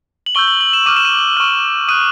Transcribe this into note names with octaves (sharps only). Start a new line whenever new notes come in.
F#7
C#6 E6 G6 G7
F#7
F#7
E7
D6 F6 D#7
E7
D#7
C#6 F6
D#6 F#6 D#7